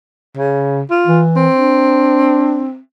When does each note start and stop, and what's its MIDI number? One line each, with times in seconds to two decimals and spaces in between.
0.37 0.81 49
0.90 1.21 65
1.07 1.48 52
1.36 2.78 60
1.55 2.64 62